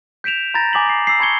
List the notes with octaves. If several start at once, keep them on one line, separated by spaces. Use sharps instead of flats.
G6 B6 D7 E7 F7
A#5 B5 G6 A6 A#6
G#5 D6 D#6 G6 B6 F#7
A6 C7
D6 E6 C7
A5 B5 C#6 G#6 C#7 G7